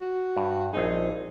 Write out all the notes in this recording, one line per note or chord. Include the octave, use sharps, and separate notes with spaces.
F#4
G2
A#1 C4 D#4 G#4